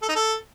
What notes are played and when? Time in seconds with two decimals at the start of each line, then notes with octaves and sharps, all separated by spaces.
0.02 A4
0.09 D#4
0.15 A4